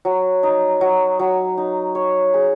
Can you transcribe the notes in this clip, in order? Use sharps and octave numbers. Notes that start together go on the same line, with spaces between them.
F#3
D#4
F#3
F#3
D#4
C#5
G#4